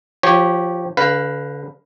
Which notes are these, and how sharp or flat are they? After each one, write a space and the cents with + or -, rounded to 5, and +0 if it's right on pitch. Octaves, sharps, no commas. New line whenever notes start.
F3 +0 G4 -10 C#5 -20
D3 -35 B4 +0 F5 +0